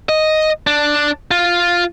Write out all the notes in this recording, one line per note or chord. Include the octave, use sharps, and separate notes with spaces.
D#5
D4
F4